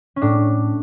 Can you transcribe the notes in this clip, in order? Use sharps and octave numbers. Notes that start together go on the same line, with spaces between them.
C#4
A2 D4